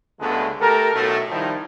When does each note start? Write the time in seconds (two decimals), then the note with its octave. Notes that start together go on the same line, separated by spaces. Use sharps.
0.20 C#2 G2 D3 G#3 A3 B3
0.60 A3 G4 A4 A#4
0.94 B1 A2 A3
1.31 D#3 F3 G3 D#4 E4